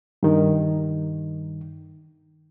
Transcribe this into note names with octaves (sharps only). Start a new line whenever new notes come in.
G2 D#3